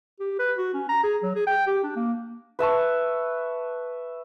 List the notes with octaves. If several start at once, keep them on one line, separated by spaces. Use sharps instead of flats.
G4
B4
F#4
C#4
A#5
G#4
F#3
G#4
G5
G4
D4
A#3
B4 E5 A5 C#6